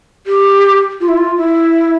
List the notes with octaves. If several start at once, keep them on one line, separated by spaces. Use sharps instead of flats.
G4
F4
E4
F4
E4